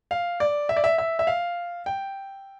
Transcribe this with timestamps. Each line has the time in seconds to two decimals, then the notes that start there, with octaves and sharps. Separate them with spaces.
0.11 F5
0.40 D5
0.69 E5
0.77 D5
0.84 E5
0.98 E5
1.19 E5
1.27 F5
1.86 G5